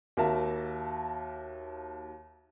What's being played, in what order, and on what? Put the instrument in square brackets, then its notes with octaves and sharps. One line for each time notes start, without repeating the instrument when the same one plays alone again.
[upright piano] D#2 F#4 A#4 E5 A5